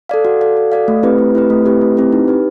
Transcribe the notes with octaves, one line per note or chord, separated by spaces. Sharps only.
A4 D5 F5
F#4
A4 D5 F5
F#4
A4 D5 F5
A3
C4 E4 G4 B4
A3
C4 E4 G4 B4
A3
C4 E4 G4 B4
A3
C4 E4 G4 B4
D#4
G4 B4